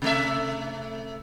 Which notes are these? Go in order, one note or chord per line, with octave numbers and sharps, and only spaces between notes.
C3 A3 E5